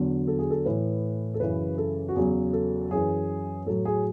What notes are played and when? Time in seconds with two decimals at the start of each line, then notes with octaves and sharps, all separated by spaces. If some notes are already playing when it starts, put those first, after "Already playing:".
Already playing: E2 D3 F#3
0.27 A4
0.39 G#4
0.50 A4
0.65 A2 E3 B4
1.34 A4
1.40 F#2 C#3 E3 B4
1.78 A4
2.08 F#4
2.15 E2 C#3 F#3 G#4
2.53 A4
2.91 F#2 E3 G#4
3.66 A2 F#3 A4
3.85 G#4